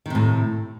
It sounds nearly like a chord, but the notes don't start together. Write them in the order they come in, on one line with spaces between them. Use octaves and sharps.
D#3 C3 A2